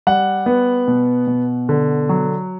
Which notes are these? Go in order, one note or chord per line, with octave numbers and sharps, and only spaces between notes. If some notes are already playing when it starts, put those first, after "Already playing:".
G3 F#5
B3
B2
B2
D3
F#3